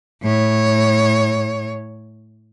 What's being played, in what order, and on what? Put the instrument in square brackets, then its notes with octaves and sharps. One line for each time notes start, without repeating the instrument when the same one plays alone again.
[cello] A2 C#5